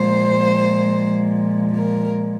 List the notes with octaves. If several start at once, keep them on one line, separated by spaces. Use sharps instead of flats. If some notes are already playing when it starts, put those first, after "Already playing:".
Already playing: A#2 F3 G#3 C5
A#4